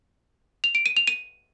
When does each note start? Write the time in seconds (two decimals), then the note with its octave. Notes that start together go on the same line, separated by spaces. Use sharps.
0.64 F7
0.75 D7
0.86 D#7
0.97 F7
1.07 D#7